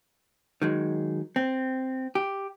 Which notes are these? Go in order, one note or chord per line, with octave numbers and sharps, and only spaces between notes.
D#3 F#3 G#3
C4
G4